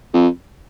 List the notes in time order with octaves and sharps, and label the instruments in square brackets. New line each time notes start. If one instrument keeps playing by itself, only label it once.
[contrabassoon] F2